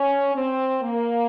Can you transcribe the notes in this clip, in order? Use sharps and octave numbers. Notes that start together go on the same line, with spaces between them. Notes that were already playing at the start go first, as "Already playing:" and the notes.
Already playing: C#4
C4
A#3